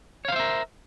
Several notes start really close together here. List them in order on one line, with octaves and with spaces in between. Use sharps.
C#5 F5 C5 E5 A#4